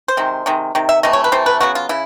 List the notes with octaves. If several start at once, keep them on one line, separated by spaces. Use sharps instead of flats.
C5
C3 D#3 G#3
C3 D#3 G#3
C3 D#3
E5
C3 E3 A3 D#5
C#5
B4
C3 E3 A3 C5
B4
C#3 F#3 B3 F#4
F4
C#3 E4